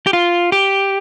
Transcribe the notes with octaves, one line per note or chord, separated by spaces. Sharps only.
G4
F4
G4